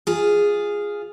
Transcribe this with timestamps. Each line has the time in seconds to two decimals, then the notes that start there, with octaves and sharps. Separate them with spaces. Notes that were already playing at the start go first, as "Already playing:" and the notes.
0.07 F4 G#4